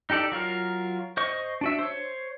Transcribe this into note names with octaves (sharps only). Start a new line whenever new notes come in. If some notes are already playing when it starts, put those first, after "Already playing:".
D#4 G4 A4 D5
F#3 F4 A#4
C5 D#5 C#6
D4 F#4 E5
C5 C#5